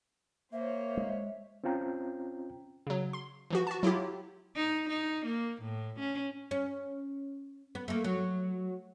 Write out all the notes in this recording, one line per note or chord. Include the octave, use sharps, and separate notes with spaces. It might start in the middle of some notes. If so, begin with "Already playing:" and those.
A#3 C5 C#5 E5
G#3
C4 C#4 F4 G5 A#5
C#3 F#3
C6
E3 F3 F#4
F#4 A5
F#3 E4 F4 G4
D#4
D#4
A#3
A2
C#4
C#4
B3
A3 A#3
F#3